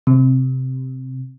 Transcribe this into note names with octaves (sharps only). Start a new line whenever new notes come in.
C3